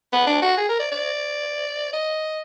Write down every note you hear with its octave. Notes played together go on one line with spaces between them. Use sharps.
B3
D4
F#4
G#4
A#4
D5
D5
D#5